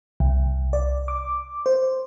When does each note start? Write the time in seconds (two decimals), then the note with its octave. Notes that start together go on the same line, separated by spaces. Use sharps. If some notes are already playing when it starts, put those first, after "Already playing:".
0.20 C2
0.73 D5
1.08 D6
1.66 C5